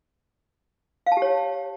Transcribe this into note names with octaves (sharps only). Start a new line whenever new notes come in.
F5
A5
G4
C#5